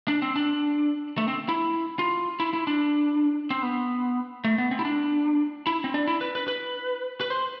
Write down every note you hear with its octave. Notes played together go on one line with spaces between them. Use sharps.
D4
C4
D4
A3
C4
E4
F4
E4
E4
D4
C4
B3
A3
B3
C4
E4
D4
E4
C4
D4
E4
B4
B4
B4
B4
C5